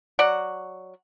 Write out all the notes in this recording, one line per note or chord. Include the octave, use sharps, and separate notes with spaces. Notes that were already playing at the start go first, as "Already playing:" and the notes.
F#3 D5 F#5